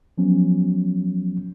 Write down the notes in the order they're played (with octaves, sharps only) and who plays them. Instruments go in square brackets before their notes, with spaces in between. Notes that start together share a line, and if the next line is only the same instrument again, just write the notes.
[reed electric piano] F3 F#3 B3 C#4